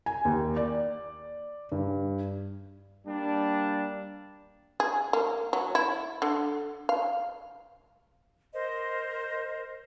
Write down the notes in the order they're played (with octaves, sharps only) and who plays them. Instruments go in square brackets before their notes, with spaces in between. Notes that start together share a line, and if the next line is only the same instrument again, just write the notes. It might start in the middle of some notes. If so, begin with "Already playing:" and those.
[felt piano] G#5
D#2
D5
G2
[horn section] G3 A#3 D4
[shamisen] G#4
A#3
F#3
E4
D3
F5
[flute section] A#4 C5 D#5